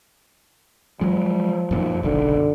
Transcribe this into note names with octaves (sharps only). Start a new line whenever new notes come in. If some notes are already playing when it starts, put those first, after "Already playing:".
F3 F#3 G#3
F#2 A#2 D#3
F#1 B1 D3